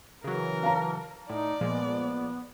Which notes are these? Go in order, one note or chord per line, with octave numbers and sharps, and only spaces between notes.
C#3 E3 F#3 A#4
F5 A5 A#5
A2 D#4 D5
A#2 F3 G#3 B3